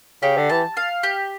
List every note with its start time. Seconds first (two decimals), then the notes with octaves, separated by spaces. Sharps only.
0.23 C#3 G4
0.37 D3
0.49 E3 A5
0.77 F5
1.03 G4